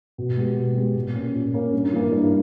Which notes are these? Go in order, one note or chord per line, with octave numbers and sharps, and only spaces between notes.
B2
G#3 B3 G4
B2
G#3 B3 G4
A#2
A#3 C#4
A#2
A#3 C#4
G2
E3 A#3
G2